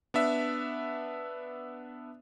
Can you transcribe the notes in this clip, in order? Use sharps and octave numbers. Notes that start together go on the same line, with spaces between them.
B3 D4 E5